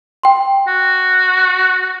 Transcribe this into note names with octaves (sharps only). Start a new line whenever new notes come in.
G5 C6
F#4